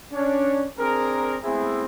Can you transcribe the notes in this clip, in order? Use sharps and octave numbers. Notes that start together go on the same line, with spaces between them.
C#4 D4 C#5
C4 D4 G#4 A#4
G#3 A3 B3 C4 E4 G#4